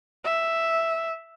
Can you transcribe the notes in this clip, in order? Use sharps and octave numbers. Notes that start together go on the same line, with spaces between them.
E5